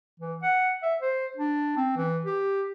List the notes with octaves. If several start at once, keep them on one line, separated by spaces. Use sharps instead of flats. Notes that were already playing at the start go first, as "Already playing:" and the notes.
E3
F#5
E5
C5
D4
C4
E3
G4